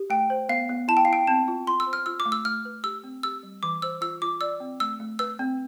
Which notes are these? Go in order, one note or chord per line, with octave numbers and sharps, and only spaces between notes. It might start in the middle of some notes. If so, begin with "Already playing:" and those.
Already playing: G4
A3 G5
C5
B3 F5
B3
E4 A5
G5
E4 F5
G5
C4 A5
F4
F4 C6
E6
C5
F6
F4 E6
D6
A3
E6
A3 F6
B4
G4 E6
C4
G4 E6
G3
E3 D6
C5 E6
F4 E6
F4 D6
D5 E6
C4
A3 E6
A3
B4 E6
C4